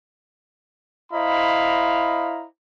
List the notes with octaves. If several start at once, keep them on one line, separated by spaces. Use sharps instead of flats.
E4 C5 D#5 F5 A#5 B5